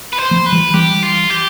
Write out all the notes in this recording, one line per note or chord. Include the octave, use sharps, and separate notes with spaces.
B4
C5
F3 A3
B4
E3 G3
E3 G3 G4
F4
G4